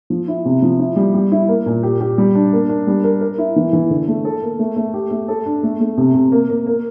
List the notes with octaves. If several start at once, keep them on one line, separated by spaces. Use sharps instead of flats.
F3
E4
C3
F3
E4
G3
G3
E4
A#3
A#2
G4
G4
G3
D4
A#3
D4
G3
A#4
A#4
E4
E3
E3
D3
A3
A4
A#3
A3
A3
G4
A3
A4
D4
A3
A3
C3
C3
A#3
A#3
A#3